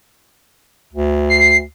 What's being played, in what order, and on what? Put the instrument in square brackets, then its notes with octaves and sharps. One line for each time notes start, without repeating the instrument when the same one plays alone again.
[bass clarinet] D2
[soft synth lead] C7